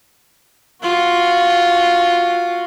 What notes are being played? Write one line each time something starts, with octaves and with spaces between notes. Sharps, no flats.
F4 F#4